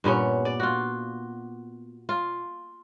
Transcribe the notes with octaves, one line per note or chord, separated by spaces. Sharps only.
G2 A#2 B3 C#4
D5
F4 F#4
F4